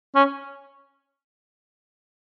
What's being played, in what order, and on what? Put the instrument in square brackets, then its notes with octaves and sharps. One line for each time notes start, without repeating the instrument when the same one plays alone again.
[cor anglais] C#4